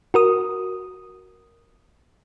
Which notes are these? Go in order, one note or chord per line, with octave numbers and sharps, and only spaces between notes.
F#4 A#4 D#6